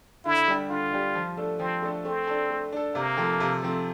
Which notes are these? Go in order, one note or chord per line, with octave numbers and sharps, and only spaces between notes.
D3 E4
G3 D4 G4
D3 F4
G3 D4 G4
F3
A3 D4 A4
F3 C4
A3 D4 A4
A3 C4
D4 A4
A3
D4 A4
C3 A#3
F3 A3 C4
C3
F3 A3 C4